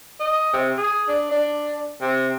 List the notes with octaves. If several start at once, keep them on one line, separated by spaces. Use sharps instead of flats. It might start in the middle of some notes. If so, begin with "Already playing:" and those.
D#5
C3
G#4
D4
D4
C3